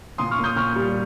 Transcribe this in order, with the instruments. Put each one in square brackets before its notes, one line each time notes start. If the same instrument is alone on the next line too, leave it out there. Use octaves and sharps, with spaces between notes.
[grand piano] A#2 C6 D#6
C#6 F6
A#3
D#6 G6
A#2 C#6 F6
G3